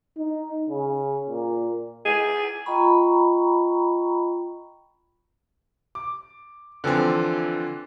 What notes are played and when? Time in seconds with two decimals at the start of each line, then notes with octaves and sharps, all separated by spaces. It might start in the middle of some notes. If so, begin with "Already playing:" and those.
0.17 D#4
0.70 C#3
1.29 A#2
2.05 G#4
2.66 F4 D#5 G5 A#5 B5 C#6
5.95 D6
6.84 D3 E3 F3 C4